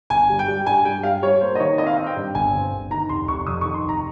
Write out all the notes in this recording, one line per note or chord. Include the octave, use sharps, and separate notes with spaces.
G1 G#5
G3
G5
G3
G2 G#5
G3 G5
G3 F5
G3 C#5
A#3 C5
D#5
D#3 C#5
C4 D#5
F5
C4 D#5
G5
G2
G1 G#5
C4
G1
D#3 A#5
F1 C6
F1 C#6
F2 D#6
D#3 C#6
C6
F1 A#5